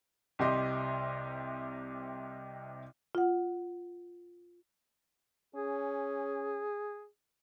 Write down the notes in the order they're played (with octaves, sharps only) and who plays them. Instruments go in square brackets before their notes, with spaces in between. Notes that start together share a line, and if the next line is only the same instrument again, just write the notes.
[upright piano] C2 C3 G4 D#5 C6
[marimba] F4 F#5
[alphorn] C#4 [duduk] G#4